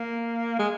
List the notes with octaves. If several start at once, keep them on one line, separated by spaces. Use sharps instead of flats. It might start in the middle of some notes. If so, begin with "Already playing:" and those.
Already playing: A#3
G#3